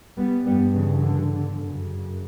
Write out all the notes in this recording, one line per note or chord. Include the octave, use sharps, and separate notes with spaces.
G3 B3
G2 G3 B3
C#3 E3
D3
D3
F#2 C#3